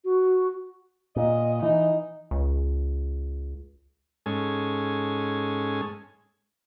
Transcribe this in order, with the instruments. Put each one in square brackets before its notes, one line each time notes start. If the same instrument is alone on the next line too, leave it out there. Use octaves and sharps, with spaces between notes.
[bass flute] F#4
[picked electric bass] A#2 [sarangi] D#5
[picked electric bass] E3 [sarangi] D#4
[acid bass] C#2
[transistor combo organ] G#2 G#3 C#4 A4 G#5